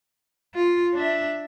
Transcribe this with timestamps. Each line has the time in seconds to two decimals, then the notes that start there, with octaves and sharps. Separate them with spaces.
0.55 F4
0.93 D4 E5